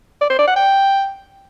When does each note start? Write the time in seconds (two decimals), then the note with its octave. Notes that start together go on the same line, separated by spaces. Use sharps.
0.21 D5
0.30 C5
0.39 D5
0.47 F#5
0.56 G5